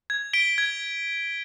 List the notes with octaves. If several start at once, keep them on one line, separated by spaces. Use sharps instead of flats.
G#6
B6 D7 G7
G#6